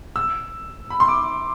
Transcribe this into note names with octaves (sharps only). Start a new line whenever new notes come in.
E6
B5
C6
D6